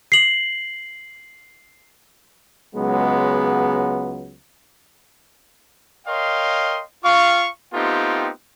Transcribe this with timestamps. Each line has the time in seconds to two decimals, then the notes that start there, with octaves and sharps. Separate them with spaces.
0.12 C7 F#7
2.75 C#2 F#3 G#3 B3
6.07 A#4 C#5 D#5 F5 G5 C6
7.05 F4 F5 C#6
7.74 A3 B3 C4 D#4 F4 G4